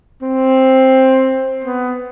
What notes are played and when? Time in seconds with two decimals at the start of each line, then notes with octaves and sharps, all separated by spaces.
0.22 C4
1.64 B3